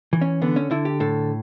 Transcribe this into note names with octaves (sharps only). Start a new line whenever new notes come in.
E3
C#4
D3 B3
C#4
D3 E4
G4
A2 A4